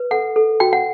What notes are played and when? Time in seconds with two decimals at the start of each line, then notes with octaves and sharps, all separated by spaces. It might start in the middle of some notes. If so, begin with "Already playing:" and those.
Already playing: B4
0.11 A4 F#5
0.36 A4
0.60 F#4 G5
0.73 F#5